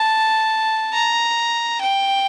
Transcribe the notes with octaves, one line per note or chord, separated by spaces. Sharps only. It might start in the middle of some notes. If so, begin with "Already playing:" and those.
Already playing: A5
A#5
G5